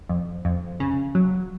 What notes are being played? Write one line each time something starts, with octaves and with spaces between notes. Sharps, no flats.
F2
F2
C#3
F#3